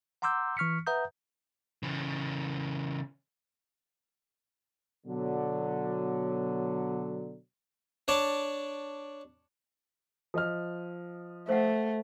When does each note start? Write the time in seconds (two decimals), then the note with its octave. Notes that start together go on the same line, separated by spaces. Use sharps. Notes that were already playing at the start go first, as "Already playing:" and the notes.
0.22 F#5 A#5 C6 D6 E6 G6
0.57 E3 C#6 F6 B6 C#7
0.87 B4 E5 F#5 A#5 D#6 G6
1.83 C#3 E3
5.07 B2 D3 F#3
8.08 D4 C#5 D5 A5
10.34 F3 D#5 F6
11.49 A3 C5 F5 F#5